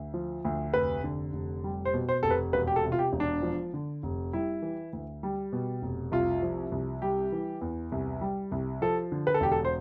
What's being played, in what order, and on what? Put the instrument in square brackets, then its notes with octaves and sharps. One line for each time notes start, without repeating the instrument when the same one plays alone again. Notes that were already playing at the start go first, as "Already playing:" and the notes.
Already playing: [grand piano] D2
F3
D2
F1 B4
D3
F1
G3
C5
B2
C5
F1 A4
B4
E1 B4
G4
A4
C3
F4
G4
E1
D4
F3
D3
F1
G3 E4
E3
D2
G3
B2
F1
C2 F4
F3
C2
G3 G4
E3
E2
C2
G3
C2
F3 A4
D3
B4
A4
E1 G4
A4
C5